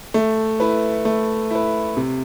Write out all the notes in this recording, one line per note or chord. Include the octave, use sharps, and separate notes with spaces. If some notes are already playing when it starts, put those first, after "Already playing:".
A3
E4 B4
A3
E4 B4
C3